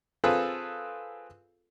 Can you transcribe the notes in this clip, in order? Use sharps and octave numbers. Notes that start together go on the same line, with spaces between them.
C4 F4 G#4 A4 B4